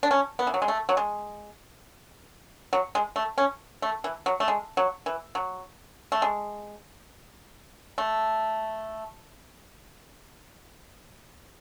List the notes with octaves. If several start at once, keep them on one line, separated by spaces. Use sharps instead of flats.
D4
C#4
B3
E3
F#3
G#3
A3
F#3
G#3
F#3
G#3
A3
C#4
A3
E3
F#3
A3
G#3
F#3
E3
F#3
A3
G#3
A3